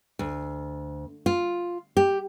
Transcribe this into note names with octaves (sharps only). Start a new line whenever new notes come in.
D2
F4
G4